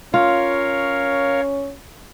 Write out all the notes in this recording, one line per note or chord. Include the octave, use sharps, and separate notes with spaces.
C#4 F4 A#4 C#5 F5